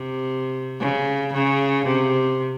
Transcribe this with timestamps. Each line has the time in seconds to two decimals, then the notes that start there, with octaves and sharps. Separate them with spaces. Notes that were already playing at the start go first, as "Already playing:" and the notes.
Already playing: C3
0.80 C#3
1.34 C#3
1.86 C3